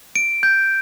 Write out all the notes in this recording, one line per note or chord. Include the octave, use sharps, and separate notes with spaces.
D7
G6